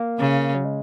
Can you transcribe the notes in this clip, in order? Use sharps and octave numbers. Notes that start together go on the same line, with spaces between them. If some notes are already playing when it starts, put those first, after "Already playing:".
Already playing: A#3
C#3
F#3
G#3